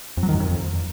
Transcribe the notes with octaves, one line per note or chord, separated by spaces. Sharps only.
F2
F#3
D#3
F#2
F2